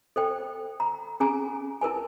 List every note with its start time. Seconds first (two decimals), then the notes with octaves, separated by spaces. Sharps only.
0.16 A4 C5 G5
0.80 A#5
1.20 C#4 G#4 G#5 A#5
1.81 E4 A#4 B4 G#5